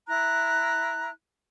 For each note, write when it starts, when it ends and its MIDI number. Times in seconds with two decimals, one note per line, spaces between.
0.08 1.10 64
0.08 1.10 82
0.08 1.10 90